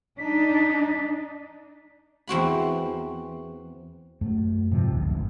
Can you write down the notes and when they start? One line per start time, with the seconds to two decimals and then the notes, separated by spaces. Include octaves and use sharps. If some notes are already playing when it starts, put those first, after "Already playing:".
0.18 D4 D#4 B6
2.28 E2 C4 F#4 B5
4.21 F#2 A3
4.71 G#2 C3 F3
4.91 G#1 D2
5.10 G1